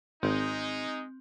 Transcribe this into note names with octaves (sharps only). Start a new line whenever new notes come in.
G#1 G#3 C4 D#4